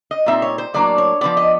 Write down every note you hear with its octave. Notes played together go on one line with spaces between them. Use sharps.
D#5
A#2 G3 C4 D#4 E5
C#5
C5
A2 F#3 A#3 D4 D5
C#5
F3 G#3 B3 D5
D#5